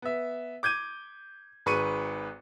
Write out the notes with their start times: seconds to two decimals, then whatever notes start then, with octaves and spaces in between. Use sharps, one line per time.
0.02 B3 E5
0.63 D6 G6 G#6 D#7
1.66 G#1 G#2 B4 C#6 C#7 D#7